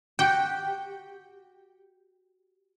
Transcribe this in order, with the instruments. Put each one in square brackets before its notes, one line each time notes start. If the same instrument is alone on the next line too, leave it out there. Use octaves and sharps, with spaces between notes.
[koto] F#4 G4 [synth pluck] G5